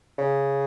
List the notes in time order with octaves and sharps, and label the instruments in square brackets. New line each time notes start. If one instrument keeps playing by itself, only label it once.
[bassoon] C#3